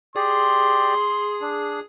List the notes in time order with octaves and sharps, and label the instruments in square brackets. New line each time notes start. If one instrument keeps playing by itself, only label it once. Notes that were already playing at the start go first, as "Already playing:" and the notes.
[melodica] G4 D5 [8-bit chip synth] G#4 [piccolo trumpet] C6
[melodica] D4